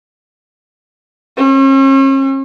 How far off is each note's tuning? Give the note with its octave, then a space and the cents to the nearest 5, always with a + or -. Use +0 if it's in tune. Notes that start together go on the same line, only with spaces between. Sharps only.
C#4 -40